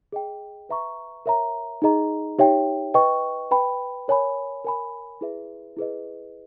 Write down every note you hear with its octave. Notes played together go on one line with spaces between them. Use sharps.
G#4 D#5 G5
B4 E5 A#5 C#6
A#4 C#5 E5 A#5
D#4 G#4 D#5 A#5
D#4 G4 C#5 E5 G5
B4 D#5 G5 C#6
B4 G5 B5
A#4 C#5 G#5 B5
A#4 C#5 G#5 B5
E4 G#4 B4 E5
E4 G#4 B4 D#5